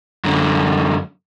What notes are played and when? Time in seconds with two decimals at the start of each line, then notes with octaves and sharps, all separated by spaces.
0.24 F#2 D3